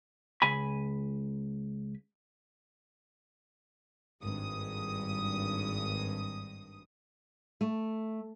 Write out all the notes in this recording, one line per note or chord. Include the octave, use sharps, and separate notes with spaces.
C#2 G#5 B5
G#1 G2 D#6
A3